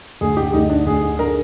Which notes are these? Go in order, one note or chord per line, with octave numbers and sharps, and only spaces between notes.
D2 G#4
G4
D2 D#4
D4
D2 G#4
G#4
D3 A#4